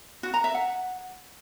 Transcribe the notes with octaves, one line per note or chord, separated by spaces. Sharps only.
F#4
A#5
E5
F#5